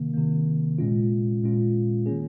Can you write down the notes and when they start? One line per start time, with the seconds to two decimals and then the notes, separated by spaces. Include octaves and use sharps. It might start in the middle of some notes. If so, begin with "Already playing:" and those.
Already playing: C3 D#3 A#3
0.14 C3 D#3 A#3
0.78 A#2 G#3 C#4 F4
1.43 A#2 G#3 C#4 F4
2.06 D#3 A#3 C#4 G#4